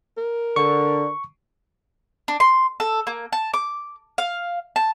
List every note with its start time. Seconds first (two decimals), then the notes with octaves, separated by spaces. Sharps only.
0.18 A#4
0.56 D3 C#6
2.28 D4
2.40 C6
2.80 A4
3.07 A#3
3.33 A5
3.54 D6
4.18 F5
4.76 A5